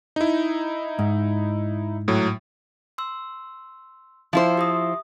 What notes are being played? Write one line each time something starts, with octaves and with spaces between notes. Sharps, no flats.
D#4 E4
G#2
A2 F#3
C6 E6
F3 E4 C5 F5 C6
G4 E5 D#6